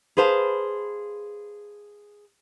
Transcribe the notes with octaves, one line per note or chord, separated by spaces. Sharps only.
G#4 B4 C5 F5 A5